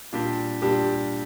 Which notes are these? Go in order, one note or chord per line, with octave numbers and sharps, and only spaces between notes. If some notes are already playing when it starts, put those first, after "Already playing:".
A#2 G3 D4 G4
A#2 G3 D4 G4